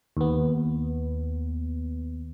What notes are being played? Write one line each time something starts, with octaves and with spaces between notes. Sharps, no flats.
D#2 B3